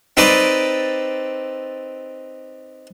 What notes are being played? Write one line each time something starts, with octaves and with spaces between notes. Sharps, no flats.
C4 D#4 A4 B4 D5